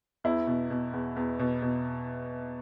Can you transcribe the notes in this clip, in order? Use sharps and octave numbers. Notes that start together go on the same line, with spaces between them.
E2 E4
B2
B2
E2
E2
B2
B2